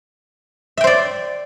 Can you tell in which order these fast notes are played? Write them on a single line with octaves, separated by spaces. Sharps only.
E5 G5 C5 D5